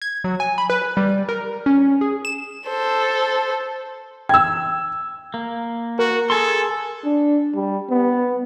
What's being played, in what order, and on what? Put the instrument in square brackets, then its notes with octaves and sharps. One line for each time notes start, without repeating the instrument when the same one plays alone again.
[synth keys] G#6
F#3
G#5
B5
B4
G3
A#4
C#4
G#4
E7
[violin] A4 C5
[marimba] G5 [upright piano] E6 G#6
[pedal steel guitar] A#3
[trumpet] F#4 [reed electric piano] A#4
[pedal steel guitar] G#4 G#5 C6 [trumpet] A4
[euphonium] D4
G3
B3